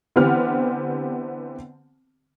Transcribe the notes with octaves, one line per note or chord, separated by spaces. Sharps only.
D3 E3 B3 C4 G4 F6